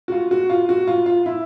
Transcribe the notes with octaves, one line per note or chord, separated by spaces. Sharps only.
F#4
F4
F#4
F4
F#4
F4
F4
E4